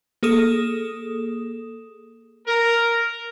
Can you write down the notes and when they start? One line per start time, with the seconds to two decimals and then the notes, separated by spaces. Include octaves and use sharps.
0.23 A#3 G#4 A4 D#6 E7
2.48 A#4